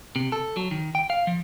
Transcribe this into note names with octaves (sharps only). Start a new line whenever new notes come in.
C3
A4
F#3
D#3
G5
F5
F3